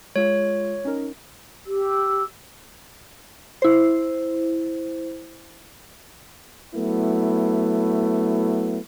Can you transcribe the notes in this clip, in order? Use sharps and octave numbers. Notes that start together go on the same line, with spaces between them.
G#3 F4 C#5
C#4 D#4 A#4
G4 E6
E4 C5
F#3 A3 B3 E4